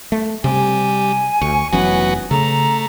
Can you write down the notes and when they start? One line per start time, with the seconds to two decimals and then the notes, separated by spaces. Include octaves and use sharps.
0.12 A3
0.44 C3 G3 G#5
1.41 D2 C#6
1.73 F1 E3 F#3 B3 C#4 F#4
2.31 C#3 A3 A#5